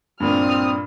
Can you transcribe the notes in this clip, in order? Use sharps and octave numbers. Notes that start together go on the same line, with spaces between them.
G2 A#2 C4 D4 D#6 F6